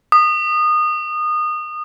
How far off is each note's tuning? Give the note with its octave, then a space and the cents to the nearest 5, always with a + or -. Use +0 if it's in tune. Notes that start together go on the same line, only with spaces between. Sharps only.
D#6 -25